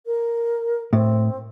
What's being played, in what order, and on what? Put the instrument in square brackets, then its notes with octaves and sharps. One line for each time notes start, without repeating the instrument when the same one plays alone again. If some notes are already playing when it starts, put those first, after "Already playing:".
[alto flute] A#4
[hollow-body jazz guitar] A2 [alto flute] C4